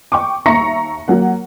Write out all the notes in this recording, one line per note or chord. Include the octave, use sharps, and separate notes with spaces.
G5 C#6 D6
D#2 E5 A#5 C#6 A#6 C#7
F#3 A#3 F#5